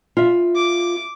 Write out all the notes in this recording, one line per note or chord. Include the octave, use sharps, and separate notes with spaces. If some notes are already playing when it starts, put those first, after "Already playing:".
F4 E5
D6